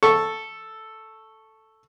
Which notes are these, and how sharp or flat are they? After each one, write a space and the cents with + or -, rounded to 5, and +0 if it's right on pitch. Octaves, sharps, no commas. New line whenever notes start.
A4 +0 C#6 -5